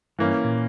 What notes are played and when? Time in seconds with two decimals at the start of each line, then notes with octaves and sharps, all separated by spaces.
0.19 G2 E3 A#3 C#4
0.44 A#2